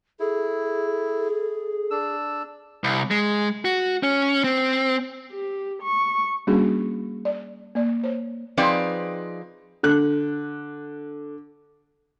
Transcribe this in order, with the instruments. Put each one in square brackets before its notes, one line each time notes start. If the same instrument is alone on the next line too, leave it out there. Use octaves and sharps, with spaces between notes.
[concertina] E4 [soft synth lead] G#4 [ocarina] A4
[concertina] D4 E6
[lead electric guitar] C2
G#3
F#4
C#4
C4
[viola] G4
C#6
[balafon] G3 A#3 C#4 D4 F#4 G#4
D5
A#3 D5
C5 C#5
[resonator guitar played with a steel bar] F3 C4 D#4 G#4 B4 D5
[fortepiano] D3 F#6